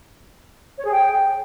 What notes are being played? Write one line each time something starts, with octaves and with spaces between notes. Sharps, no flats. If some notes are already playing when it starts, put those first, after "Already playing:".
C#5
G#4
G5